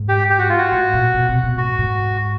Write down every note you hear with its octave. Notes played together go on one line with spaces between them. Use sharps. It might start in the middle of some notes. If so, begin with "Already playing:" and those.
Already playing: G#2
G4
G4
F#4
F4
F#4
A2
A#2
B2
C3
B2
A2 F#4
G#2